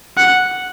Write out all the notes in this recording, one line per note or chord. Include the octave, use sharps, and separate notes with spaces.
F#5